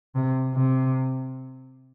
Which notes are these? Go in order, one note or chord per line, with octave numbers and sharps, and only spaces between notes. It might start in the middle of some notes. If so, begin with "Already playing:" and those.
C3
C3